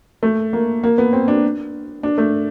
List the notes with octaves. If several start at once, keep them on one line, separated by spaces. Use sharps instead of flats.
A3
A#3
A#3
B3
C4
D4
D4
A3